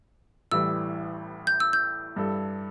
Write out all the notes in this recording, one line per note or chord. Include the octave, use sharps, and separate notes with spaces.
A1 A2 E3 G3 E6
G6
E6
G6
G2 G3 E4 A4